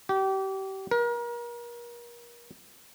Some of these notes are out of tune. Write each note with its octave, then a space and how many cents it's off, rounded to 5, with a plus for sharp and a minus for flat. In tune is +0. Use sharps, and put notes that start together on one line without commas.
G4 -30
A#4 +35